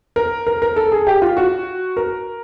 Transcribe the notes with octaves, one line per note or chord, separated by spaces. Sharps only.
A#4
A#4
A#4
A4
G#4
G4
F4
F#4
A#4